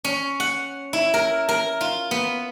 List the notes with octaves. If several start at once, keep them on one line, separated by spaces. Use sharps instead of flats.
C#4
F#5
E4
A#4
A#4
F4
B3